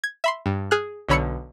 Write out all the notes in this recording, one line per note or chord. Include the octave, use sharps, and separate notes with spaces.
G#6
E5 B5 C6
G2
G#4 F6 F#6
B1 D3 C#5 B5 E6 C#7